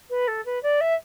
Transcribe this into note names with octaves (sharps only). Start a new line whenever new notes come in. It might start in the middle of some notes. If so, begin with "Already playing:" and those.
B4
A4
B4
D5
E5